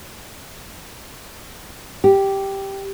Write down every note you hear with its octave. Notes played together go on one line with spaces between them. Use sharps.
G4